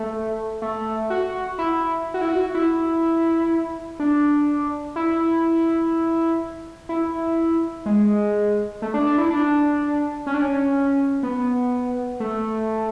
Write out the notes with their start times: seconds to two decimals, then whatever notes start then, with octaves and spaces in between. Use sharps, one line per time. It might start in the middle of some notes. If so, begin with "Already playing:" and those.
Already playing: A3
0.62 A3
1.10 F#4
1.59 E4
2.14 F#4
2.21 E4
2.29 F#4
2.55 E4
4.00 D4
4.96 E4
6.89 E4
7.86 G#3
8.82 A3
8.94 D4
9.07 D4
9.18 E4
9.30 D4
10.27 C#4
10.34 D4
10.42 C#4
11.23 B3
12.20 A3